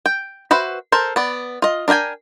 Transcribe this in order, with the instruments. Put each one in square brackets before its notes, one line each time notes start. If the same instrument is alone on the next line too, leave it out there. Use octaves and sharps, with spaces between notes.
[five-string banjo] G5
F#4 B4 C5 E5
A4 A#4 C5
B3 D5
F4 D#5
D4 A#4 D#5 G5 G#5